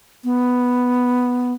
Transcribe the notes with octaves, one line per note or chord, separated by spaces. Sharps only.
B3